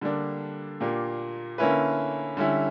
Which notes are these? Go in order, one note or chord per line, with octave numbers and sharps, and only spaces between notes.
D3 G3 A#3 D4
A#2 A#3 D4 G4
D3 A#3 C#4 E4 B4
D3 G3 C#4 E4